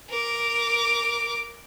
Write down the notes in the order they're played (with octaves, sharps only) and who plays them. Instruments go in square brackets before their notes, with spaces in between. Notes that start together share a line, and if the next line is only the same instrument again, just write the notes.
[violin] A#4 D6